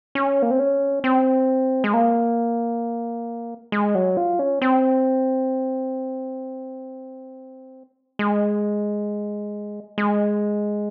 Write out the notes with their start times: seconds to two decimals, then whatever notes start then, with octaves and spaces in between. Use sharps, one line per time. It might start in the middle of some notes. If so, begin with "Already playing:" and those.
0.15 C#4
0.42 A#3
0.51 C4
0.59 C#4
1.04 C4
1.84 G#3
1.94 A#3
3.72 G#3
3.95 F#3
4.17 F4
4.39 C#4
4.62 C4
8.19 G#3
9.98 G#3